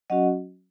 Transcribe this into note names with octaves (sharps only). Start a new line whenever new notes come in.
F#3 C#4 F#4 D#5 F#5